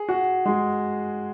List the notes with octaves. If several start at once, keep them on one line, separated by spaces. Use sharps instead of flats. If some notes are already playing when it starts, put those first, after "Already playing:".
Already playing: G#4
F#4
G#3